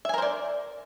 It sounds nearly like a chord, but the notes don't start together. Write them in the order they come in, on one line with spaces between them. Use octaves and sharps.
E5 G#5 A#4 C5 D5